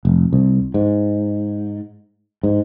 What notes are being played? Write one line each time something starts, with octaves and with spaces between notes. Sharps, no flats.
F1
C2
G#2
G#2